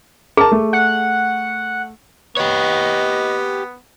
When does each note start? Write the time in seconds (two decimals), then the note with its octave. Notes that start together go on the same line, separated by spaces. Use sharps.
0.37 G#4 A#4 A5
0.52 A3
0.73 F#5
2.37 B3 G4 C#5 D#5